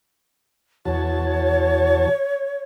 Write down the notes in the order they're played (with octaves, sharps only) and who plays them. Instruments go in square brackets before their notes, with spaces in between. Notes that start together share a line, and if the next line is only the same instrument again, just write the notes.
[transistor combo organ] E2 F#4 A5 [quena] C#5